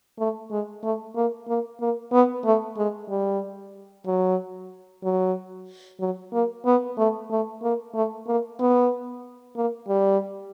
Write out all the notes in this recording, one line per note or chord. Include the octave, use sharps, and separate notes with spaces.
A3
G#3
A3
A#3
A#3
A#3
B3
A3
G#3
G3
F#3
F#3
F#3
A#3
B3
A3
A3
A#3
A3
A#3
B3
A#3
G3